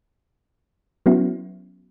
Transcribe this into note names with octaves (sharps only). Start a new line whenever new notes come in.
F#3 B3 C#4 E4 F#4